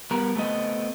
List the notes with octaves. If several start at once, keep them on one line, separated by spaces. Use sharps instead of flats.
G3 B3 A#4
A3 B3 C4 D#5